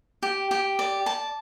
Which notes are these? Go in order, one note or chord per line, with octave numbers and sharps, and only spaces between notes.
G4
G4
D5
A5